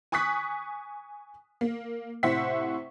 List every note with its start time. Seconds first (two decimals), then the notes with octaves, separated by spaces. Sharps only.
0.12 G#5 C#6 D#6 F#6 B6
1.61 A#3
2.23 A2 C3 C5 E5 F#5 B6